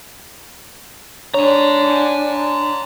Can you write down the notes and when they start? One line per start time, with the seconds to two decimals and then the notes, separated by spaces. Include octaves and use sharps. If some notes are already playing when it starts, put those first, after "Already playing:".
1.34 D4 C#5 G#5 A#5